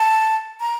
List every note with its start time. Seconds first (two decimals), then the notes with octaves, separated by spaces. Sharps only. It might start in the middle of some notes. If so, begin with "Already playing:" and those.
Already playing: A5
0.60 A#5